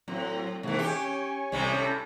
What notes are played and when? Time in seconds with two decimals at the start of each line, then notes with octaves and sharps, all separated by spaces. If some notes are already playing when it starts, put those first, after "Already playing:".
0.08 A2 F#3 C4 A#6
0.63 G#2 C3 E3 G#3 A#3
0.78 C#4 G4 G#5 C#6
1.52 C2 A2 C3 G3 G#5 D7
1.73 C#4 A4